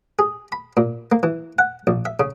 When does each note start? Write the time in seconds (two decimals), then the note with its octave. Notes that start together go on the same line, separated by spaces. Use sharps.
0.19 G#4
0.52 B5
0.77 A#2
1.12 A#3
1.23 E3
1.59 F#5
1.87 A#1
2.05 E5
2.20 C#3